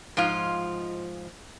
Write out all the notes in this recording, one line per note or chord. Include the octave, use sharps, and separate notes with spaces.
G#2 F3 G#3 F4